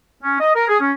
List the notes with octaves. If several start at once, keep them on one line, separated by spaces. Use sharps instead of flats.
C#4
D#5
A#4
G#4
C#4